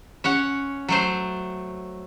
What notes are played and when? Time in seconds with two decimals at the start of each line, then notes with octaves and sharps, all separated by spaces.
0.24 C#4 C#5 F#5
0.89 F#3 A3 C5